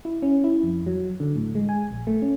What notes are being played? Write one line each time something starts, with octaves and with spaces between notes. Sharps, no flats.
E4
C#4
E4
F2
F#3
D3
A2
G#3
G#5
A#1
A3
C#4